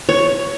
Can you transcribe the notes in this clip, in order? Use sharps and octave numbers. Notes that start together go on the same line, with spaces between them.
C#5